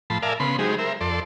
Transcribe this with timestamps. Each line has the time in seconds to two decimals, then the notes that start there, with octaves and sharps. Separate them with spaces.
0.10 A2 F3 A5 B5 C6
0.22 A#4 D5 E5 F5 G#5 A5
0.40 C#3 B3 B5 C6
0.59 F#3 G#3 D#4 G4 G#4 C5
0.78 A#4 C5 E5
1.01 F2 A4 D5 C6